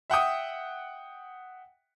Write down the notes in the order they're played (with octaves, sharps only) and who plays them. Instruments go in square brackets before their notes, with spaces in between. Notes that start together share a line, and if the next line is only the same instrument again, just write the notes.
[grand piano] E5 F#5 G5 D#6